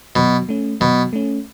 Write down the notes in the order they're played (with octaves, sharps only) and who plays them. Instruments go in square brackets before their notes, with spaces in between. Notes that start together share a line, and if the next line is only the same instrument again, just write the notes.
[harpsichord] B2 [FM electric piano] F#3
[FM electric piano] A3 C#4
[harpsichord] B2 [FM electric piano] F#3
[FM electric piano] A3 C#4